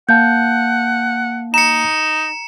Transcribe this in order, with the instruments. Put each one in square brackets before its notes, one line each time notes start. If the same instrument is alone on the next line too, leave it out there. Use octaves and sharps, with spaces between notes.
[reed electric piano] A#3 F5 A5 [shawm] F#5 [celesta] G6
[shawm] D#4 [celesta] A#5 [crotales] C#7 E7